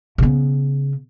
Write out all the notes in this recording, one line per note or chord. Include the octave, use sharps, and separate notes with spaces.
C#3 B3